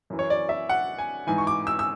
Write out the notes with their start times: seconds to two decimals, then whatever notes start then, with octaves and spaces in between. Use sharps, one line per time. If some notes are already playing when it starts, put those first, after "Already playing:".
0.10 F#2 E3
0.19 C#5
0.30 D5
0.49 E5
0.69 F#5
0.99 G#5
1.27 G#2 E3 G#5
1.38 C#6
1.47 D6
1.67 E6
1.79 E6